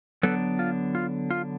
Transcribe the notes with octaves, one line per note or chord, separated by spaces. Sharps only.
D3 F#3 B3 D4 A4 B4
F4
F4
F4